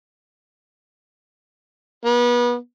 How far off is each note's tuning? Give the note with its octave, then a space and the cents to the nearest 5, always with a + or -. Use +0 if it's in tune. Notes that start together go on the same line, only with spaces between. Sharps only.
B3 -30